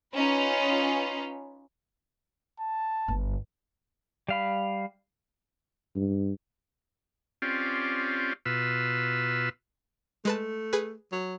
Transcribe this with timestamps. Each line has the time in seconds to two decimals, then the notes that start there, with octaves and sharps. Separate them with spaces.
0.15 C#4 D#4 F4 B4
2.59 A5
3.08 G1
4.29 G3 F5 B5
5.96 G2
7.42 C4 C#4 F4 G4 D5
8.46 B2 F4 B4 E6
10.25 G#3 A3 B4 A5
10.73 G#4 B4
11.13 F#3